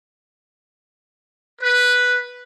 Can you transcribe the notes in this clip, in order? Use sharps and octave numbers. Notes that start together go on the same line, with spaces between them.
B4